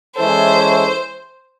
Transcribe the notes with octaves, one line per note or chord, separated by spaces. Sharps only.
E3 G#3 C#4 E4 A4 C5